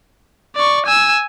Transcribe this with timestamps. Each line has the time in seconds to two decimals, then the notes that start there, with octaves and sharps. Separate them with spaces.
0.55 D5 C#6
0.86 G#5 E6